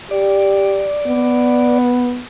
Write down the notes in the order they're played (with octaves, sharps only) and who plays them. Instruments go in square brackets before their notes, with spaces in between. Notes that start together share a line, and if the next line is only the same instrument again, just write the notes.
[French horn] G4 [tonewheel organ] D5
[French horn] B3